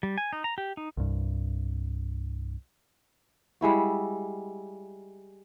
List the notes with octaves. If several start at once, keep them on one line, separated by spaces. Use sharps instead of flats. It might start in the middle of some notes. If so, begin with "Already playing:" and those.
G3
G#5
D#4
A#5
G4
D#4
C2 G2
G3 G#3 E4 F#4